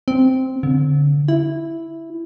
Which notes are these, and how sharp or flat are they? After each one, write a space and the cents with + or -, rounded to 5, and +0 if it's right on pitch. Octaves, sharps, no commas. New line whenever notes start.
C4 -5
D3 -20
E4 +0